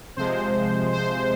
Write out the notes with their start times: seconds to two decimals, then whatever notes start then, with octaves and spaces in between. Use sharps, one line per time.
0.16 C3 F3 G#3 C5
0.93 C5